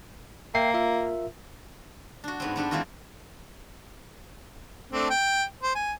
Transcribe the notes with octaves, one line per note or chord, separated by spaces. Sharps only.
A#3 E5 G5 C7
F4 A#4 E5
D4 F#4
G#2 B3 C4
B3 D4 G4 A4
E3 G#3 A#3 C4 F4 F#4
A3 C4 D4
G5
C5
G#5